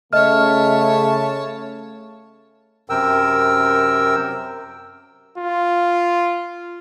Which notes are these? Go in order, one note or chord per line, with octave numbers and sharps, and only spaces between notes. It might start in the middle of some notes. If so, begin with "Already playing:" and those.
C#3 A3 C#5 D#5 E5 A5 F6
F#2 C3 A#4 G5 E6
F4